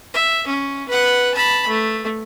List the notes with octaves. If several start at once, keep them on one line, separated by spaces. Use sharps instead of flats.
E5
C#4
B4 F#5
A5 B5
A3